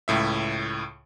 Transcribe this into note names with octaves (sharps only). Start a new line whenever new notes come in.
C#2 A2 E5